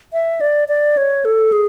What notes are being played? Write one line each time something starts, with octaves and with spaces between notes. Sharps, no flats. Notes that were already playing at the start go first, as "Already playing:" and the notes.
E5
D5
D5
C#5
A4
G#4